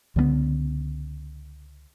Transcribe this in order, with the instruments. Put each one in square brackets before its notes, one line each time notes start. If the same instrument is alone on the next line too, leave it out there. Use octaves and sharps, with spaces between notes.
[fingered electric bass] C#2 D3 F#3 B3